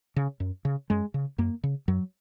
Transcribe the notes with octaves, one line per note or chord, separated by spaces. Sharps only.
C#3
F#2
C#3
F#2 G#3
C#3
F#2 A#3
C#3
F#2 F#3